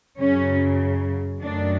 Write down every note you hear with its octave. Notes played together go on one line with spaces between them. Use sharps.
F#2 C#3 F#3 C#4
F#2 D#3 F#3 A3 D4